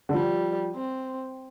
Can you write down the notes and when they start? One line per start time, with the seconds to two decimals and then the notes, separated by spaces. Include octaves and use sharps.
0.09 D3
0.14 F3 G3
0.75 C4